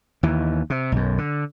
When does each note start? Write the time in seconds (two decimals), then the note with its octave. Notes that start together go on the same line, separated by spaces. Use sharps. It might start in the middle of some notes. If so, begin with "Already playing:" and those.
0.23 D#2 E3
0.70 C3
0.92 B1 F#2
1.18 D3